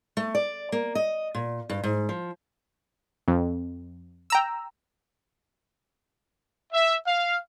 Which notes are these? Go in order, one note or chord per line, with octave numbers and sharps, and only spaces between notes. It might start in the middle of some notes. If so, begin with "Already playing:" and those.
A3
D5
A#3
D#5
A#2
G2
G#2
F3
F2
G5 A#5 E6
E5
F5